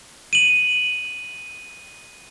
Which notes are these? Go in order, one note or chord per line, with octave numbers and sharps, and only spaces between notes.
D#7 F#7